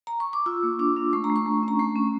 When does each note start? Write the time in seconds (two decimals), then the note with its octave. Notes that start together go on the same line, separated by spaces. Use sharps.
0.07 A#5
0.20 C#6
0.33 D6
0.46 F4 E6
0.63 A#3
0.79 D4 D6
0.96 D4
1.13 A3 C#6
1.24 A#5
1.30 A3
1.36 C#6
1.46 A3
1.63 C#4 A#5
1.79 A3 C#6
1.96 C#4